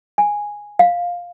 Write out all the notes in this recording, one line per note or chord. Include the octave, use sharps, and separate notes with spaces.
G#5
F5